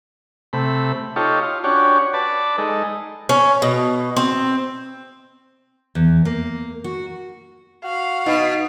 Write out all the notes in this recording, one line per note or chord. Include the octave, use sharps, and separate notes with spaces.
C3 A3 B5
D#4 F4 G4 A4 C#5
F4
C#4 D4 F#4 G4 C#5
B4 D5 A5
G#3 D#4 A4
C#4
B2
C4
E2
A#3
F#4
F#4 F5
B2 D#4